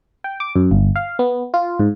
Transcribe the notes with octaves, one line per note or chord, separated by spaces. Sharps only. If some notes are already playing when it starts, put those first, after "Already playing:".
G5
D6
F#2
G1
F5
B3
F4
G#2